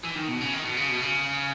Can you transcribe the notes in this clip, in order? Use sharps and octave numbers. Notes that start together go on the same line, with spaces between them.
E3
D#3
B2
C#3
D#3
B2
C#3
B2
C#3